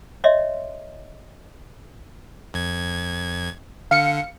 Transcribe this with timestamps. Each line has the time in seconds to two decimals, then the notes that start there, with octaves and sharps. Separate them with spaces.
0.24 C#5 D#5 E5 C6
2.54 F2 G#6
3.91 D3 F5 C#7